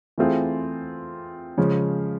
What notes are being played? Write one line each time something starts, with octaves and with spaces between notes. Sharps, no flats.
E3 A3 C4 F4 G#4
C#3 F3 G#3